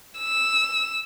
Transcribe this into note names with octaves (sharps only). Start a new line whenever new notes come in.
E6